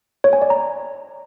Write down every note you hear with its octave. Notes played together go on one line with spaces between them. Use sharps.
C#5
G#5
D5
A#5